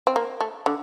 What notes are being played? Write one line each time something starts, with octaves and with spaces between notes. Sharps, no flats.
C4
A#3
A3
D3